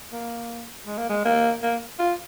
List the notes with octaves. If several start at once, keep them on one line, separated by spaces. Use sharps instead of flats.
A#3
G#3
A#3
G#3
A#3
A#3
F4